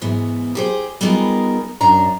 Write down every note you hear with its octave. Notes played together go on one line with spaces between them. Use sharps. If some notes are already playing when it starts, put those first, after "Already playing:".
G#2 E3 B3
G4 G#4 C5
G3 B3 D#4 F4 G#4 A#4
F#2 D4 A#5